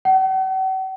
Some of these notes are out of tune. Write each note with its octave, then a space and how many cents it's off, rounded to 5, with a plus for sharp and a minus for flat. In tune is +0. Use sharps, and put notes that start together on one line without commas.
F#5 +45